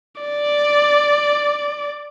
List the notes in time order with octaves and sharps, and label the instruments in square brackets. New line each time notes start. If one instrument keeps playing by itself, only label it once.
[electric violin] D5